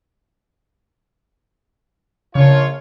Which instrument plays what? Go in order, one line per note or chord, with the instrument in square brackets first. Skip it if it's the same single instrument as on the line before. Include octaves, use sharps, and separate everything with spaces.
[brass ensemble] A#1 F4 C#5 [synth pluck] C#3